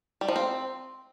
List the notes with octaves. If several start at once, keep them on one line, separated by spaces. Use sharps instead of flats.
G3
F3
C4